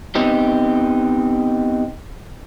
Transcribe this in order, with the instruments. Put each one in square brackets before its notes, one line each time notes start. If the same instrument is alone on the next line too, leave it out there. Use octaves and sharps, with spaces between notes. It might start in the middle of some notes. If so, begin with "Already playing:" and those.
[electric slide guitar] B3 C4 D#4 G4